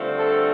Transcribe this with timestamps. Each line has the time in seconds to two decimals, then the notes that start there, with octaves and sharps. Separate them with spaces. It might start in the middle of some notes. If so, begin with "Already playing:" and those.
Already playing: G2 D3 F3 A3 C4
0.17 A4